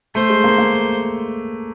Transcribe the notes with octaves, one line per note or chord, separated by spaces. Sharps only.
A3 C5
G#3
A#3
A#3